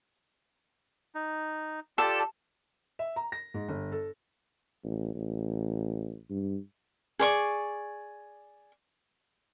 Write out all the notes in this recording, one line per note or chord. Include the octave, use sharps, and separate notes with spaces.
D#4
F4 G4 A4 D5
E5
A#5
A#6
G#2
G1
A4
A1
A1
G2
G#4 D5 C#6